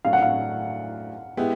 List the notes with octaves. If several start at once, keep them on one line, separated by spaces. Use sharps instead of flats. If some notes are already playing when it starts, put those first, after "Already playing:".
A2 F#3 A3 D4 F5
F#5
F5
G#3 B3 E4 G4 G5